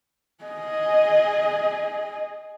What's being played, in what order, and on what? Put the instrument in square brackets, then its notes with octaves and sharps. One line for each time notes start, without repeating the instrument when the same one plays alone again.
[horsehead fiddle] G#4 D#5